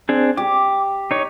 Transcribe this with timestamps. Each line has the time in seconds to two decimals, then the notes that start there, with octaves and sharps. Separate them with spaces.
0.09 C4 D4 G#4
0.37 G4 D6
1.11 D#4 C#5